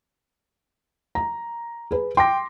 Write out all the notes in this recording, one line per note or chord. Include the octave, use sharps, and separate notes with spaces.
A#5
G#4 B4
G5 C6 D6 A#6